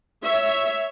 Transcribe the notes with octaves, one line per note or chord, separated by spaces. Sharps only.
C#5 E5